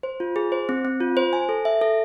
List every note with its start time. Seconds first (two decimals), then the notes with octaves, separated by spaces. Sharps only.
0.03 C5
0.20 F4
0.36 G#4
0.52 C5
0.69 C4
0.85 C4
1.00 F4
1.17 C5
1.33 G#5
1.49 A4
1.65 E5
1.81 A4